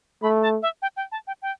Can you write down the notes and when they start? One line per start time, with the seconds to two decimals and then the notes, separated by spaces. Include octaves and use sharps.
0.22 A3 B5
0.42 A5
0.62 E5
0.82 G5
0.97 G5
1.12 A5
1.27 G5
1.42 G5